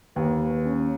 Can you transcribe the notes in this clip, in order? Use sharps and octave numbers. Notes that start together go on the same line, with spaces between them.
D#2 B4
C#4